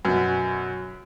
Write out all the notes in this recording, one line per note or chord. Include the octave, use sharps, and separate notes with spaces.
F#2 B2